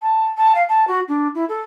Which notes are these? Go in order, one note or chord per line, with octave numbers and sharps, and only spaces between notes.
A5
A5
F5
A5
F#4
D4
E4
A4